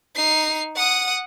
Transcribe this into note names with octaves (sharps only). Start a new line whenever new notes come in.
D#4 C7
F#5 D#6